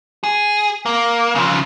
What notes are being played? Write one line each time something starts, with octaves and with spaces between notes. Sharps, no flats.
G#4
A#3
C#3 F3